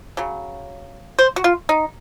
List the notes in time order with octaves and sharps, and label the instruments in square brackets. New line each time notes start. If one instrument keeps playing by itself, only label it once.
[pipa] C#3 F#3
C5
F#4
F4
D#4